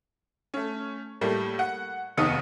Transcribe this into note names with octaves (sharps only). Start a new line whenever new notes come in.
A3 C#4
A2 G3 A3 A#3
F#5
F1 D#2 B3 D#4 D#6 C#7